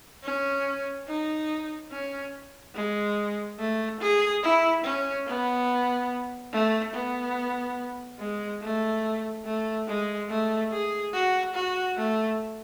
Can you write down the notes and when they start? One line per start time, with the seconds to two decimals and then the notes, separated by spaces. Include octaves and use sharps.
0.24 C#4
1.08 D#4
1.91 C#4
2.75 G#3
3.59 A3
4.00 G#4
4.43 E4
4.84 C#4
5.27 B3
6.53 A3
6.94 B3
8.20 G#3
8.62 A3
9.45 A3
9.88 G#3
10.30 A3
10.71 G#4
11.14 F#4
11.55 F#4
11.97 A3